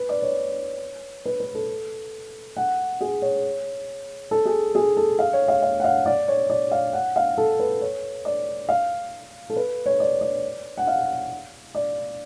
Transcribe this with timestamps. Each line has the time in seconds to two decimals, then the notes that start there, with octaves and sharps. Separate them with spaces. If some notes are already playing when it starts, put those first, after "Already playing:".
Already playing: B4
0.09 D5
0.22 C#5
1.25 B4
1.40 B4
1.55 A4
2.57 F#5
3.01 G#4
3.22 C#5
4.31 A4
4.45 G#4
4.75 G#4
4.97 A4
5.19 F5
5.33 C#5
5.48 F5
5.62 F5
5.80 F#5
5.84 F5
6.06 D5
6.28 C#5
6.50 D5
6.71 F5
6.93 F#5
7.16 F5
7.38 A4
7.59 B4
7.81 C#5
8.25 D5
8.69 F5
9.50 A4
9.56 B4
9.86 C#5
10.00 D5
10.21 D5
10.78 F#5
10.87 F5
11.75 D5